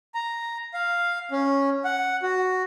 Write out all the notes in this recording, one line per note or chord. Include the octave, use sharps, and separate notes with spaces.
A#5
F5
C#4
F#5
F#4